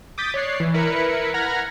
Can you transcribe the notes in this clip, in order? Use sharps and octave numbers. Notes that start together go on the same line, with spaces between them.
D6 D#6 G6 A6 B6
C#5 D5 F#6 C7
E3
E4 A#4 B4 B5 C#7
F#5 A#5 B5 F6 G#6 A#6